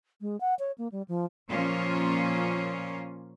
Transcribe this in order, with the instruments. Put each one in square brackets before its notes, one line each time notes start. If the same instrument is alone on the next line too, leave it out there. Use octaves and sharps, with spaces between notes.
[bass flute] G#3
F#5
C#5
A#3
G3
F3
[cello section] A#2 F3 A#3 C#4 F4